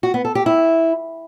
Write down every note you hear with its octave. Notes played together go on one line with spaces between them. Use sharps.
F#4
B3
A4
G4
E4